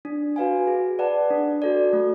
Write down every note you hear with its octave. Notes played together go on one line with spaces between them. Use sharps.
D4
F#4 B4 F5 G#5
G#4
B4 D5 F#5 A5
D4
F#4 A4 D5
A3